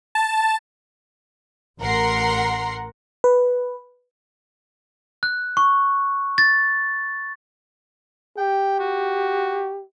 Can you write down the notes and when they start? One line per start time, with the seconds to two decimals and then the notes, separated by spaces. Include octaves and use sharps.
0.15 A5
1.80 A1 A#4 F#5 A#5 C6 C7
3.24 B4
5.23 F#6
5.57 C#6
6.38 A6
8.38 G4 G5
8.80 F#4